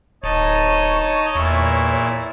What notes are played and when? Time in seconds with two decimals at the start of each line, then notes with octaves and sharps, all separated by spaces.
0.23 D1 D#4 C#5 D#5 A5
1.35 E2 A#2 E4